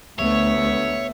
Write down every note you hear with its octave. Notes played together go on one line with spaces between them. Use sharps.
D2 A3 B3 C#5 E5